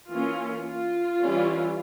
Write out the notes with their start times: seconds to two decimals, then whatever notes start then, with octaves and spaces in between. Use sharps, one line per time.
0.11 E3 A#3 C#4 F4
0.66 F4
1.21 E3 G3 C#4